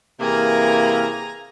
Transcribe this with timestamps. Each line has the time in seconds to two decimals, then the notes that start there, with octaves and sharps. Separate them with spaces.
0.20 C3 E3 A#3 G#4 A#5